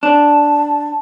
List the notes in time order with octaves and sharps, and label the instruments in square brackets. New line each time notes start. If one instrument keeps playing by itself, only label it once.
[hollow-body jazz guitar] D4 [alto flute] A5